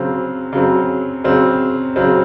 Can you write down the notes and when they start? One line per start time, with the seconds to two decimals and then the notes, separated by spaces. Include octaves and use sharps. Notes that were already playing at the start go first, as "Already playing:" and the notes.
Already playing: C#3 F#3 C4
0.53 C#3 F#3 C4
1.24 C#3 F#3 C4
1.96 C#3 F#3 C4